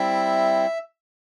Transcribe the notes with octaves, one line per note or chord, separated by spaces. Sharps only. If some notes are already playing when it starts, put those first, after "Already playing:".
Already playing: G3 C4 E4 E5